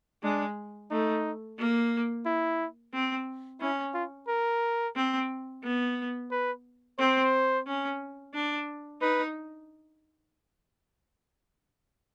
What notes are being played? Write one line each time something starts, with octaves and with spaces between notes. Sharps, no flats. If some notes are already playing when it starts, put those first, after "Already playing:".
G#3 D4
A3 D#4
A#3
E4
C4
C#4 E4
F4
A#4
C4
B3
B4
C4 C5
C#4
D4
D#4 B4